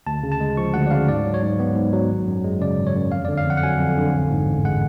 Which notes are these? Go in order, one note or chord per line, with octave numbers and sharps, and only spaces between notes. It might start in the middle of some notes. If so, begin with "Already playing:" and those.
D2 A5
C#3
A5
G#3
F3 C#6
D2 F#5
D5
C#3 F5
G#2 D5
F#3
C#5
G#2
B3
G#2
F#3
G#1
F#2
G#3
C#3 D5
G#1
C#5
F#2
F2 F5
D3 D5
F5
F2 F#5
F#5
F#3 G#5
F2
D3
A1
G#2
A1
G#3 F#5